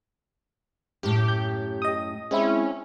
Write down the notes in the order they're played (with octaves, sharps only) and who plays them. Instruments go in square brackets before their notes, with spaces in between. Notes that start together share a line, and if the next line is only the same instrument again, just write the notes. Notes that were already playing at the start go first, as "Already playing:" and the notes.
[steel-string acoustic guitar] F#2 A2 [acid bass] G4
[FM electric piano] G6
D#5 D#6
[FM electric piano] G#3 C4 E4 [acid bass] C#4